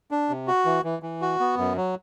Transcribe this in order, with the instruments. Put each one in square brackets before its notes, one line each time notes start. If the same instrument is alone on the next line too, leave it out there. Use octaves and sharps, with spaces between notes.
[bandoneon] D4
C3
F#4
E3
E3
E3
F#4
B3
F#2
F#3